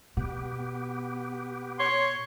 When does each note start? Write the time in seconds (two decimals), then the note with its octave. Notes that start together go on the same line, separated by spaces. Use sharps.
0.17 B2 B3 G4
1.79 C#5 C6